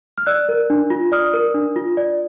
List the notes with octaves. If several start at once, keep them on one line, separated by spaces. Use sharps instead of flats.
F6
D5 E6 F#6
A#4
D4
F4
D5 D#6 F6
A#4
D4
F4
D5